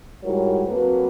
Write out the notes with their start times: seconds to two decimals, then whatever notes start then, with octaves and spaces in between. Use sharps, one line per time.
0.23 G#2 G3 E4 F#4 A#4 C#5
0.68 F#3 A#3 C4 A4 B4